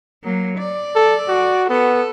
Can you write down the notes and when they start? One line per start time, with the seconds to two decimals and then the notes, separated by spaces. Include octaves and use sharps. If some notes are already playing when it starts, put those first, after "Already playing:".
0.23 F#3 A#3
0.58 D5
0.96 A4
1.28 F#4
1.69 B3 A4